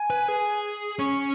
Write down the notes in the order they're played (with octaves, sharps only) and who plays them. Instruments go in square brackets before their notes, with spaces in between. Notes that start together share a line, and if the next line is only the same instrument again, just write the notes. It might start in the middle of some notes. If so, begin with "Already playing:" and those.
Already playing: [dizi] G#5
[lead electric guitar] B4
G#4
[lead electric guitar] C#4 [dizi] C#6